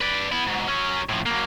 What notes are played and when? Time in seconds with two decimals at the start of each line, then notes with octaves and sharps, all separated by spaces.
0.01 B4 D5
0.32 B3 E4
0.47 G#2 B2
0.68 F#3 C#4
1.09 A2 F3
1.26 F#3 A#3